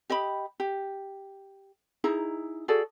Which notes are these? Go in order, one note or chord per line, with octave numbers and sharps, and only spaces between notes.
G4 D#5 G5 B5
G4
D#4 E4 G#4 A#5
F#4 G#4 A4 D5